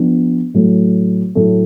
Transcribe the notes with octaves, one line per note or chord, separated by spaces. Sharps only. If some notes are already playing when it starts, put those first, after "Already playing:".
Already playing: F3 B3 D4
A2 F#3 A3
A2 F#3 A3